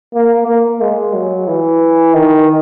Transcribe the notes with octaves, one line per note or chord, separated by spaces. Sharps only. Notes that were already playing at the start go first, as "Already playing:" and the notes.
A#3
A#3
G#3
F#3
E3
D#3